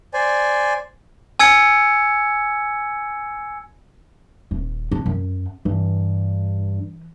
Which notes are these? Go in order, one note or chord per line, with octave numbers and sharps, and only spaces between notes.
C5 D5 G#5
G#5 E6 G#6 C#7
D#1
D4
F#2
G2 E3